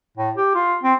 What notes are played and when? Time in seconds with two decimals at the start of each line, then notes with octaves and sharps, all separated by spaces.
0.17 A2
0.37 G4
0.55 F4
0.83 C4